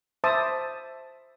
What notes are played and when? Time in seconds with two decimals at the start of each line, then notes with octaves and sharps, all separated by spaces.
0.24 C5 E5 A5 B5 D6 D#6